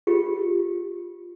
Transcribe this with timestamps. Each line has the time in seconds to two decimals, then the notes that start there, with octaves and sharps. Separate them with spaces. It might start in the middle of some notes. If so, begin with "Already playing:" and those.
0.07 F4 G4